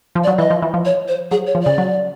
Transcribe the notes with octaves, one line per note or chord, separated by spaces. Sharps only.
F3
D5
F#3
E3 D#5
F3
E3
F3
C#5
C5
F#3 G#4
C#5
F3
C#3 D5
F#3